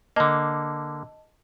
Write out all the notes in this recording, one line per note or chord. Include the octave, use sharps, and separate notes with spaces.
D3 A#3 D#5 A5